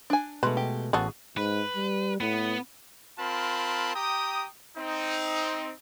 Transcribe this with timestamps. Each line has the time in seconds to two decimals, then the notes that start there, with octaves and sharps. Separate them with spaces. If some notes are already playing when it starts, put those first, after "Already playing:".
0.10 D4 G#5
0.43 B2 G#3 A3 B4
0.57 G4
0.93 A1 C#3 B3 F#4 G#4 A4
1.37 G#2 B4
1.76 G3
2.21 A2 B3
3.18 C4 F4 A#4 A5 B5
3.95 G4 G5 A#5 D#6
4.76 C4 D#4